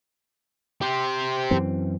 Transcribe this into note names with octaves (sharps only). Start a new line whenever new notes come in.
G4 C5
F#2 E3 C4